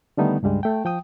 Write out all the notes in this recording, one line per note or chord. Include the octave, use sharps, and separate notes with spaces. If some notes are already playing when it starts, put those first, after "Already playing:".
D3 D#3 G3 A3 B3 D#4
C#2 G2 G3 G#3
A3 G5
F3 G5 D#6